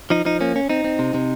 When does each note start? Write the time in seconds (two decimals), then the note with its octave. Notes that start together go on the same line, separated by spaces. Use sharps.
0.10 F3 D#4
0.25 F3 D#4
0.41 A#3 C#4
0.56 C#4
0.69 C4 D#4
0.84 C4
0.99 C3
1.14 C3